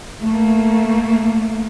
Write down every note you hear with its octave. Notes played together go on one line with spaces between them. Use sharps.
A3 A#3